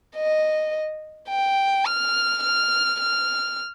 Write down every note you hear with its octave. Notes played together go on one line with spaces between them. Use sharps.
D#5
G5
F6
F6
F6